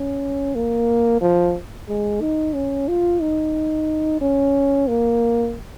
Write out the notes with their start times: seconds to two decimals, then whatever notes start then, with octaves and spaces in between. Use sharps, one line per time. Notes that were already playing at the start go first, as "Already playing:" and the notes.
Already playing: C#4
0.55 A#3
1.21 F3
1.88 G#3
2.21 D#4
2.55 C#4
2.88 F4
3.21 D#4
4.21 C#4
4.88 A#3